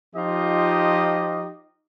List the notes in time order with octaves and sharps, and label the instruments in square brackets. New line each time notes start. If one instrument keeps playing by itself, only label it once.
[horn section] F3 D#4 F4 G4 D#5